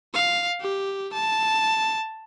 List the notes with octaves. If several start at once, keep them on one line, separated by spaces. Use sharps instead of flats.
F5
G4
A5